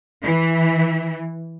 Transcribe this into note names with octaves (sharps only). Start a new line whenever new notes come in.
E3